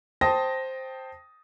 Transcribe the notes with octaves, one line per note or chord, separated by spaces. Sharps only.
C5 G5 A5 D#6 A#6